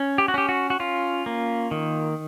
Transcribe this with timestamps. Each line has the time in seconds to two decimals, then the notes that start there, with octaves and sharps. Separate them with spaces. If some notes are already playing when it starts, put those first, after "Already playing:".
Already playing: C#4
0.18 G4
0.28 F#4
0.34 C#4 G4
0.49 F#4
0.70 F#4
0.80 C#4 F4
1.26 A#3
1.71 D#3